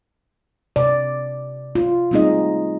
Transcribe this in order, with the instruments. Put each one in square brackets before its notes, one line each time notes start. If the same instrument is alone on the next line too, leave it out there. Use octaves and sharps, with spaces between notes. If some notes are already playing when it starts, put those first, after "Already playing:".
[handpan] C3 D5
F4
G3 A3 C4 D#4 G#4 D#5